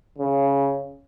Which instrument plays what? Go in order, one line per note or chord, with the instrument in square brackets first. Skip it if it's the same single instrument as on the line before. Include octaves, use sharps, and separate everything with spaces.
[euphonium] C#3